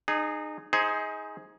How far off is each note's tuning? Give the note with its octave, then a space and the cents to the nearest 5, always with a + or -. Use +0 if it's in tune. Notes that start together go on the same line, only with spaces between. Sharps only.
D#4 -30 G#4 +0
D#4 +25 G#4 +0 C5 +0